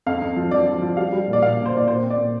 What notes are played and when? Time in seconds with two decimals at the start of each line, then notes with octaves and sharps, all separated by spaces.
0.06 F2 F5
0.22 F2
0.36 F3
0.51 F3 D5
0.67 F3
0.82 F3
0.97 G3 F5
1.12 G3
1.28 A#2
1.33 D5
1.42 A#2 F5
1.53 F5
1.58 A#2
1.66 C5
1.73 A#2 D5
1.87 A#2 C5
2.03 C4
2.10 D5
2.18 A#2